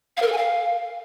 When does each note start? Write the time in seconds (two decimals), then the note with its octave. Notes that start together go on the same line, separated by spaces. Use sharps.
0.17 F5
0.22 A#4
0.27 A4
0.32 G#5
0.37 F5